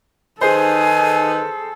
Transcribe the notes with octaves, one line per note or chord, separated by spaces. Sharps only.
D#3 D#4 G#4 A4 B4 C5 G#5